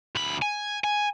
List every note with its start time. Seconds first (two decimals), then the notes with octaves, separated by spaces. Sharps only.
0.16 D2 B5
0.42 G#5
0.84 G#5